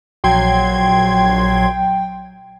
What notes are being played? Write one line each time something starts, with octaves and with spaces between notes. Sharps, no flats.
A#1 F#3 G5 C6 G#6